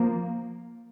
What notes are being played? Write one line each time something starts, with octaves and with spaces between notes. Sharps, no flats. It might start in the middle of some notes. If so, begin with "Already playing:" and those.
Already playing: F3 A#3